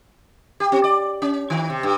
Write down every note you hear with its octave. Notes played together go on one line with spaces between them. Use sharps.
G4
C4
D5
C#4
D#3
C3
G2